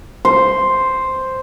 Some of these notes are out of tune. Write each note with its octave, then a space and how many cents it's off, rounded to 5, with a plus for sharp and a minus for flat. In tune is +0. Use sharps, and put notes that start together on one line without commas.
C5 +0